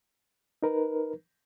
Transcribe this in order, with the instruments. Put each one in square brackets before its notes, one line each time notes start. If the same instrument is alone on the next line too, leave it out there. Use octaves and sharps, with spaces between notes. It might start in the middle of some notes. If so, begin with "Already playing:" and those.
[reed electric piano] D#4 A#4 B4